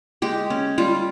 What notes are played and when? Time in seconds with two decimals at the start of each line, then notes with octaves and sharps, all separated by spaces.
0.22 G#3 G4
0.50 C#4
0.78 G3 F4